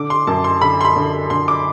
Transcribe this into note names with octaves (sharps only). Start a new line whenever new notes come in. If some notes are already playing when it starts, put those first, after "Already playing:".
Already playing: D3 D6
C6
F#2 A5
C6
D3 B5
C6
B5
D3
D3 C6
D6